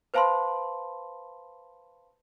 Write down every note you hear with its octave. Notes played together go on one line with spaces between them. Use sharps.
B4 C5 F5 A5 B5 C6